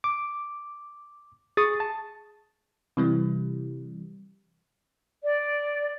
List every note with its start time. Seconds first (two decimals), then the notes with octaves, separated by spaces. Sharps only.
0.04 D6
1.57 G#4 C#6 D#6 A6
1.80 A5
2.97 C3 E3 G3
5.23 D5